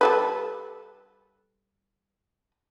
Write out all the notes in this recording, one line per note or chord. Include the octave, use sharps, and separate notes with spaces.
G3 A4 B4